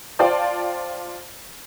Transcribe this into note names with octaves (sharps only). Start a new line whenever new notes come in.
F4 C5 D5 G5 A5